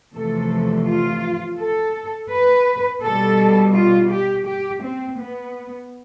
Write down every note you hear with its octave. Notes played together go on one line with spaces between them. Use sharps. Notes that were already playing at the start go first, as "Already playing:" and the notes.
E2 C3 F3 A3 A4
F4
A4
B4
B2 G3 A4
F4
G4
G4
C4
B3